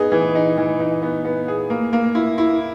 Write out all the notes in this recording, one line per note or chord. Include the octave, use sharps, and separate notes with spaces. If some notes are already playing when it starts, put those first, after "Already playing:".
Already playing: B3 D#4 G#4
E3
D#4
E3
D#4
B3
B3
G#4
A#3
A#3
E4
E4